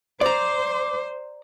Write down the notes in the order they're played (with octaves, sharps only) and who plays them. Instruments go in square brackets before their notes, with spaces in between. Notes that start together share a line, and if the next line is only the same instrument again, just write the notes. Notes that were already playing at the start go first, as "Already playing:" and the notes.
[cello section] C5 [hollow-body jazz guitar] D5 A#5 [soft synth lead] D6